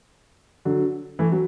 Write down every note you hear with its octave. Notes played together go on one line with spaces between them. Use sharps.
D3 F#3
E3 A3
F#3